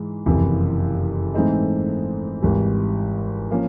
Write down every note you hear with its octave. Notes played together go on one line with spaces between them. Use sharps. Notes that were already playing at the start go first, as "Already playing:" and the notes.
Already playing: G#2 E3 G#3
F#1 F2 C3 E3
G#2 E3 A3 C4 D#4
G#1 G#2 E3 G3
F3 A#3 C#4